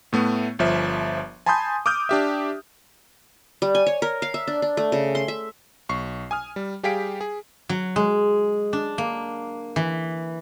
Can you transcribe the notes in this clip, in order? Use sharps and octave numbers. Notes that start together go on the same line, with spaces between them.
A2 A3 B3
G1 F3 E5
G#5 A5 B5 C6 D#6 G6
D6 D#6 F6 G6
D4 G4 E5
G3
G#5
C#5
A#4
F5
E5
D4
D4
A3
C#3
C6
E5
B1 C#6 C7
G#5 D#6 F6
G3
G3 G4 G#4 F5 B6 D7
G#4
F#3
G#3
D4
A#3
E3